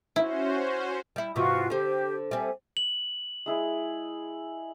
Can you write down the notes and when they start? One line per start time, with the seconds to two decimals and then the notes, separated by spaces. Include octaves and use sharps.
0.16 C#4 E4 F#4 C5
1.16 G3 E4
1.36 G#2 C3 E3 F4 F#4 C#6
1.70 D3 G4 C5
2.31 G3 C4 A4 E5 G#5
2.77 F#7
3.46 G#3 E4 G#4